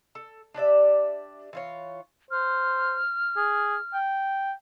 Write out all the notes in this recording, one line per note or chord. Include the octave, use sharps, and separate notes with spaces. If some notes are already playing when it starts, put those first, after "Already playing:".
A4
D4 G4 D5 E5
E3 F4 C#5
C5 F6
G#4
G5